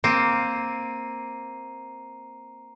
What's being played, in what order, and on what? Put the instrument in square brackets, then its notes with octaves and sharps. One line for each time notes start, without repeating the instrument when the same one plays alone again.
[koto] A#3 C4 [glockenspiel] A#5 C7 D#7